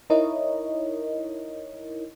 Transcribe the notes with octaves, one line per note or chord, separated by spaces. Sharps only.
D#4 E4 A#4 C#5 D#5